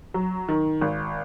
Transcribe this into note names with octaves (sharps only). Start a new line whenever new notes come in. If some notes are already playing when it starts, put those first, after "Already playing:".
F#3
D#3
G#1